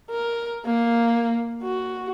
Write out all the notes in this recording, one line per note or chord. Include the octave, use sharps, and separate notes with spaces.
A#4
A#3
F#4